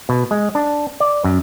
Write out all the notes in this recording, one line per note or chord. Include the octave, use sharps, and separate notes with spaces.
B2
G#3
D4
D5
F#2